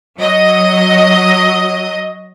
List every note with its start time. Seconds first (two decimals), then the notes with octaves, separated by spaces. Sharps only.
0.19 F#3 D#5